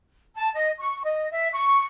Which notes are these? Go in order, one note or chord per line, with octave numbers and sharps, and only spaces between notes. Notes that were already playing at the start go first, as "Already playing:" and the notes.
A5
D#5
C#6
D#5
E5
C#6